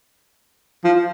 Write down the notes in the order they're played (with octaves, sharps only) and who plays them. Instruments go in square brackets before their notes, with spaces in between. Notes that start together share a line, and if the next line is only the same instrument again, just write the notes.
[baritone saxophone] F3